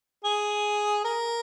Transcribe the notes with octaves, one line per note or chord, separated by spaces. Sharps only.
G#4
A#4